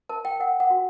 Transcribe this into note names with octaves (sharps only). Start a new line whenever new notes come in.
A#4 A5
G5
A#4 F#5
F#5
F#4